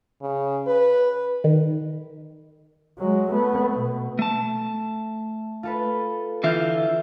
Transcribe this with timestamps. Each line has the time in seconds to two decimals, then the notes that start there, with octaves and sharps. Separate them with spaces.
0.22 C#3
0.67 B4
1.44 D#3
2.98 F#3 G#3
3.30 A3 B3
3.76 B2
4.19 A3 A5
5.63 F4 A4 B4
6.43 D3 E3 F4 E5 F6 G6